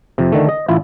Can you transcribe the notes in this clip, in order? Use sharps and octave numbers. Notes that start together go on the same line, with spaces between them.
F2 C3
D3 D#3 A3
D#5
A1 E4 F4